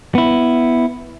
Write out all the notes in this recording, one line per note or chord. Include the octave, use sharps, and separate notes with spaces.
B3 E4